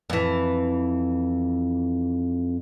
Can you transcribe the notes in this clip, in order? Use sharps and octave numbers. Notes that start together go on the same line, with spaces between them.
F2 E3